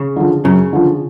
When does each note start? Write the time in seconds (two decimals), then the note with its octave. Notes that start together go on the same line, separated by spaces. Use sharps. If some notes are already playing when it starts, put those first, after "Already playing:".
Already playing: C#3
0.16 D3 F3
0.44 F#2 C#3
0.73 D3 F3